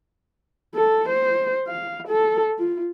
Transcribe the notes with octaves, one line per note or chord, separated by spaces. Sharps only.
A4
C5
F5
A4
F4